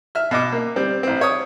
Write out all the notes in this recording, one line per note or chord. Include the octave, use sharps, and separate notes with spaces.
E5 F6
B2 D#5 D6
A#3
G3 C4
A1 C4
C#5 D#6